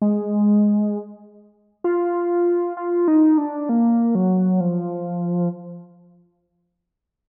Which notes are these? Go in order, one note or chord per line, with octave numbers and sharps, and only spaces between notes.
G#3
F4
F4
D#4
D4
A#3
F#3
F3